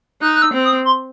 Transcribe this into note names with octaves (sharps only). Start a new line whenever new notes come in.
D#4 F#6
F#6
E6
C4
D#6
C6